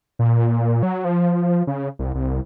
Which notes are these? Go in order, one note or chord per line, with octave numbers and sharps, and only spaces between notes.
A#2
F#3
F3
C#3
C2
C2